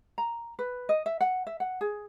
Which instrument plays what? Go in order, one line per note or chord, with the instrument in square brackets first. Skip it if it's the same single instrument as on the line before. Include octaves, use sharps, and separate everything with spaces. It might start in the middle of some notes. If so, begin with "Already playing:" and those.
[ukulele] A#5
B4
D#5
E5
F#5
E5
F#5
G#4